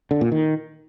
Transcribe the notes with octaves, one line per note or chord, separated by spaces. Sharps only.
D3
A#2
D#3